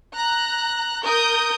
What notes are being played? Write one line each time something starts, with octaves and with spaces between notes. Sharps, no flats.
A#5 F#6
A#4 D#6 G6